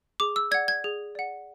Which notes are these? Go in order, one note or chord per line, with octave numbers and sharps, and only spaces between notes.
G#4 D6
E6
D5 F#5 G#6
G#6
G#4
D5 F#5